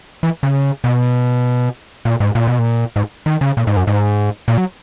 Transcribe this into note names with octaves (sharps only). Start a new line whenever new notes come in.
E3
C#3
B2
A#2
G#2
A#2
B2
A#2
G#2
D#3
C#3
A#2
G#2
F#2
G#2
A#2
F#3